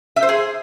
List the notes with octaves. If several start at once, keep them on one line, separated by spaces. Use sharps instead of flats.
E5
C5
G#4